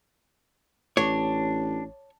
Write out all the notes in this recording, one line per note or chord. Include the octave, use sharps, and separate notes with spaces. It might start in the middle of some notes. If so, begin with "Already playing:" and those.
A1 D4 C#5